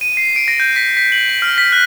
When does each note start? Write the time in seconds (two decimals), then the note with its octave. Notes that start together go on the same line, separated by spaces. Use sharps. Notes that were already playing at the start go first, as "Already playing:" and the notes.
0.01 D#7
0.17 C7
0.36 D7
0.48 A#6
0.60 G6
0.76 B6
0.97 B6
1.12 F#7
1.29 B6
1.42 F6
1.58 B6
1.72 F#6